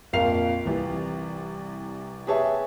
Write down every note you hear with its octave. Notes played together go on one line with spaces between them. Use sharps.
A#1 F2 A#4 F5 C7 F7
C2 E3
G4 G#4 B4 C#5 E5 A5